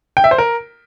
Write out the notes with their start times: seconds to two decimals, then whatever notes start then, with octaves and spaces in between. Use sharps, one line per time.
0.17 G5
0.24 E5
0.31 C5
0.38 A#4